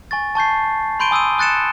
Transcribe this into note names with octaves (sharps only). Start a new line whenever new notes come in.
G#5 C#6 A6
A5 C#6 G6 C7
B5 C6 G6 D7 D#7 G7
G#5 D#6 E6 G6 D#7
D#6 F#6 A6 C#7 E7